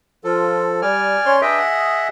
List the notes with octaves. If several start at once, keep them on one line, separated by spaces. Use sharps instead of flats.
F3 F4 A4
G3 D5 G#5 F6
C#4 C#5 C6
D4 G#4 B4 D#5 E5 G5
F#5